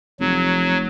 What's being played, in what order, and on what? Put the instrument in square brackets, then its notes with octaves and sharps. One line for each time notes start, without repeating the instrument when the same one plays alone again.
[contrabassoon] F1 [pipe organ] F#3